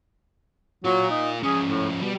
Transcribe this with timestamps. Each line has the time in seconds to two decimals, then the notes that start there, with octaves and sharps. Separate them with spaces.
0.85 F#3 F4 A#4
1.10 D#4
1.43 F3 C#4 G#4
1.66 A2
2.02 B2 G3